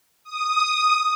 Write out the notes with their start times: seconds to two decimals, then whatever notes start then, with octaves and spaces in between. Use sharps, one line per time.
0.24 D#6